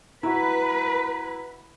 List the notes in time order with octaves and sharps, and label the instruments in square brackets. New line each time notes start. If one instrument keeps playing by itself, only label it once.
[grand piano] E4 F#4 [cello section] B4 [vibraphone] A#5